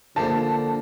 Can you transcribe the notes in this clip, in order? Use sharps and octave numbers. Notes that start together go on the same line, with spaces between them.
D3 F3 A#3 A5